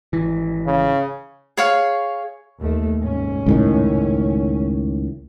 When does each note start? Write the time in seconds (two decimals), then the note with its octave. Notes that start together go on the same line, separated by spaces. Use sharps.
0.13 G#1 E3
0.66 C#3
1.57 G#4 C#5 F5
2.60 D#2 A3
2.97 F1 G#2 C#4
3.46 C#2 A2 D#3